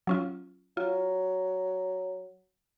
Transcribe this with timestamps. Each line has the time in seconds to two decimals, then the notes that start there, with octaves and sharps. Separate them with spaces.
0.07 F#3 C#4 F4
0.77 F#3 F4